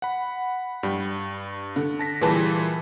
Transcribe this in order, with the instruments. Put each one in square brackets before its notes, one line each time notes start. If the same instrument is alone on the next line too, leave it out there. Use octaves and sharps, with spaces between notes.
[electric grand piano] F#5 B5
[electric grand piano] G2 [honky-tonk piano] G3
[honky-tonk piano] D3
[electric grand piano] A5 A#6 B6
[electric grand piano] A#2 E3 G3 [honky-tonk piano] G#4 B4 A5